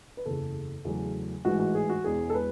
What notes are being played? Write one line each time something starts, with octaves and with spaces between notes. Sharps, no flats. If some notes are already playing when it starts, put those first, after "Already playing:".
B4
F#1 E2 C#3 A4
E2 C#3 F#3 A3
A1 G#2 E3 G#3 F#4
F#4
G#4
F#4
E1 E2 B2 G#3 G#4
A4
B4